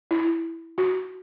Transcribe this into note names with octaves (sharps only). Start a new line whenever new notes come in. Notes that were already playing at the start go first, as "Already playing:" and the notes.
E4
F#4